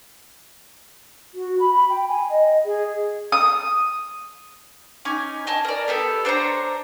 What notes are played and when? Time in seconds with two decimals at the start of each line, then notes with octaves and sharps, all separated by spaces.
1.35 F#4
1.60 B5
1.73 B5
1.90 G5
2.08 G#5
2.30 D#5
2.65 G#4
3.32 D#6
5.05 C#4 D#4 G#5 D6
5.47 D#5 G#5 A5
5.65 A#4 D5
5.88 B3 G4 A4
6.25 D4 C5 C#5 A#5